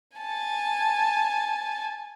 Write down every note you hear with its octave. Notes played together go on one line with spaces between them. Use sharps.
G#5 A5